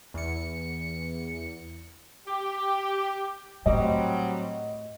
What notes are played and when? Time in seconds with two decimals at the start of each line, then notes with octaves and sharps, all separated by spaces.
0.14 E2 C#7
2.27 G4
3.66 A2 F#3 G3 C4 D#5